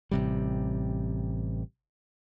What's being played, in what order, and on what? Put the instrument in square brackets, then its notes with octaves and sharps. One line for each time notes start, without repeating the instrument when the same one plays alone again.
[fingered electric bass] A1 C3 G3